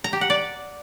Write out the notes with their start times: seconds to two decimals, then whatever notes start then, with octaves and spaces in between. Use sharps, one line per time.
0.04 A#5
0.13 G4
0.21 F#5
0.30 D5